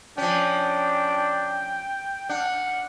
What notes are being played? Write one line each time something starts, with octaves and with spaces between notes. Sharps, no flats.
F3 C#4 D4 G5
D4 F#5